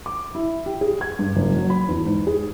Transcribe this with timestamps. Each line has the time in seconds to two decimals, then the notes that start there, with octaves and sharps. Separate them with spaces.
0.06 D6
0.35 E4
0.66 G4
0.81 G#4
1.01 G#6
1.19 G2
1.36 F#1
1.57 F#3
1.70 B5
1.89 E2
2.06 G#2
2.27 G#4